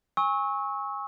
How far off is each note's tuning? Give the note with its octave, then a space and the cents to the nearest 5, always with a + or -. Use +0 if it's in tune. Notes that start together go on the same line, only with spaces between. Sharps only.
G#5 -25 C#6 -15 E6 -35